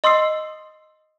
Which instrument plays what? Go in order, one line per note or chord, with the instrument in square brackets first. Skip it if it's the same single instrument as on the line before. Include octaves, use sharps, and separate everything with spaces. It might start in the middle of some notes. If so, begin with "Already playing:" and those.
[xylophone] D#5 C6 D#6 E6 C7